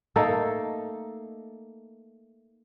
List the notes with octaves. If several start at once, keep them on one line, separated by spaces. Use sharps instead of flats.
A3 A#3 D#4 A4